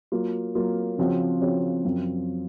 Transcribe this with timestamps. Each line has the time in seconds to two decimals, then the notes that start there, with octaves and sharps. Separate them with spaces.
0.12 F#3 A#3 F4
0.55 F#3 A#3 F4
0.98 C#3 F3 C4 F#4 C#5
1.41 C#3 F3 C4 F#4 C#5
1.85 F#2 F3 C4